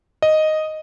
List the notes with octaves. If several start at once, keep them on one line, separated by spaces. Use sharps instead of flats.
D#5